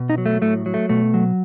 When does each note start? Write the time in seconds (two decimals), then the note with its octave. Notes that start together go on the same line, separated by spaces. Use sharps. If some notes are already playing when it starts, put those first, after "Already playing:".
Already playing: B2
0.09 D#4
0.18 F#3
0.26 A3
0.41 A2 A3
0.66 F#3
0.74 A3
0.89 B2 A3
1.14 F#3